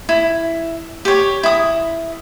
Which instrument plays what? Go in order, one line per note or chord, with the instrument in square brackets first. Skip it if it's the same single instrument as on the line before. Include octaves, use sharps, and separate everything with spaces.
[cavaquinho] E4
G4 C#5
E4 D#6